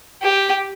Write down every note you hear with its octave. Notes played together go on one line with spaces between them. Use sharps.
G4